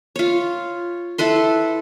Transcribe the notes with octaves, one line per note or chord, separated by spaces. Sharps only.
F4 C#5
E4 A4 B4 C6